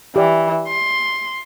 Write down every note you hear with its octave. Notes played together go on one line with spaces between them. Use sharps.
E3 G4 D5
C6